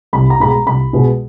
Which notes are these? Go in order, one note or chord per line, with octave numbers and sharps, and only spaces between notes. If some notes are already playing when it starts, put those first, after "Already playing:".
C2 B5
A#5
B2 G#3 B5
A#5
C2 B5
B2 G#3